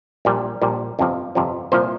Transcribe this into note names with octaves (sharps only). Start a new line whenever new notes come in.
A#1 A#2 G3
A#1 A#2 G3
G1 F2 C3 F3
G1 F2 C3 F3
C2 A#2 F3 C5